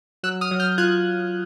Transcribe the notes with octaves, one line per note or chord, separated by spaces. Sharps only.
F#3 E6 F#6
D#6 F6
F#3
F6 G6
F4 F#6 G#6